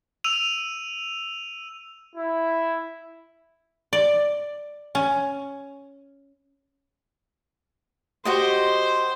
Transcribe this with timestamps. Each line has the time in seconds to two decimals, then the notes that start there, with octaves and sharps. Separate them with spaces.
0.24 E6 D#7 F7
2.16 E4
3.93 D5
4.95 C#4
8.25 F#4 G4 C5 D#5